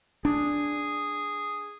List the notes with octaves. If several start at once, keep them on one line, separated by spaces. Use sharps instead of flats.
D4 G#4